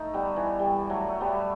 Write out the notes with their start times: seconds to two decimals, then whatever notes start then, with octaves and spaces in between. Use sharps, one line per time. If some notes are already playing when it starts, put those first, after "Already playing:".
Already playing: A3 D#4
0.14 G3 B3
0.36 E3
0.59 G3
0.89 F#3 A3
1.09 A3
1.20 G3 B3